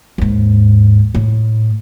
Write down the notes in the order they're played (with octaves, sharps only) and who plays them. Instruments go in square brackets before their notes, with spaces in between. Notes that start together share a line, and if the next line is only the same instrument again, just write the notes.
[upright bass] D#2 G#2
A2